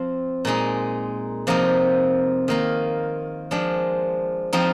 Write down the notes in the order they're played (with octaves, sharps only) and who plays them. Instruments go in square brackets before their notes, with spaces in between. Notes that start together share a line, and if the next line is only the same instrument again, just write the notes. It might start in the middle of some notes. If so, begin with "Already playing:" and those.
Already playing: [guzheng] F3 C4 F4
A#2 G#3 D#4
C3 F3 A#3 D#4
D#3 A#3 F4
F3 G#3 D4
F3 C4 D#4